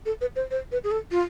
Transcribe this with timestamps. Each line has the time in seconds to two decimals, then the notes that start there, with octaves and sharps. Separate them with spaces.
0.06 A4
0.21 B4
0.36 C5
0.51 C5
0.72 B4
0.84 G#4
0.91 A4
1.11 F4